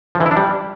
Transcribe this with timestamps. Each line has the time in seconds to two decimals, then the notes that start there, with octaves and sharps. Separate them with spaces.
0.15 F3
0.20 E3
0.26 E4
0.31 D4
0.37 G3